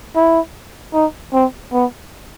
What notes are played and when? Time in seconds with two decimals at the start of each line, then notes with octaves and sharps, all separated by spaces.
0.16 E4
0.94 D#4
1.33 C4
1.73 B3